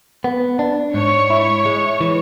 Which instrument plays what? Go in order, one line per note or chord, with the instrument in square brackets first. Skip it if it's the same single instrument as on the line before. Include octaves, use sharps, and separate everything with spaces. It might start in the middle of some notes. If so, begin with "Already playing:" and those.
[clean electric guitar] B3
D4
[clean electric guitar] G#2 [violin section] C#5 C#6
[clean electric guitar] E4
G#3
E3